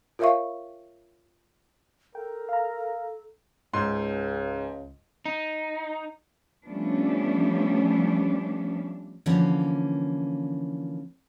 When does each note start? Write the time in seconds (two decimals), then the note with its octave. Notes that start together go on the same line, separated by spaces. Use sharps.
0.19 F4 A#4 C#5 E5 F5 C#6
2.15 A4 A#4 G5
2.49 F5 A#5
3.73 C#2 G#2 C6
5.26 D#4
6.67 F3 G3 A3 B3 C#4 D4
9.26 D3 E3 F3 A#3 C#4